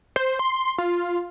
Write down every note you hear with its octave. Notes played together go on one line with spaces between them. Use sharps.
C5
C6
F4